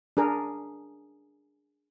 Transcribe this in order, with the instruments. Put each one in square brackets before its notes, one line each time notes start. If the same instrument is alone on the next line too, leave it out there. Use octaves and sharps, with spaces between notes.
[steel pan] D4 G#4 A#4